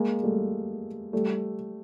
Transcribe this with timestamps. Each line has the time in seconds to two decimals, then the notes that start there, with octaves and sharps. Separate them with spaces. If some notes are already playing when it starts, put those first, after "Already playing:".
Already playing: G#3 A#3
0.23 G3 A3
1.13 G3 A3